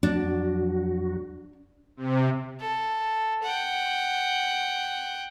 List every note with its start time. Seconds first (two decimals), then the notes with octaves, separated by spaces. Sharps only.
0.03 F2 F#3 D4 F#4
1.97 C3
2.60 A4
3.42 F#5 G5